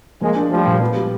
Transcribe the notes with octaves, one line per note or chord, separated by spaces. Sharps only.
F3 G#3 A#3
D4
F3 G3 A3
A#2
B3
G3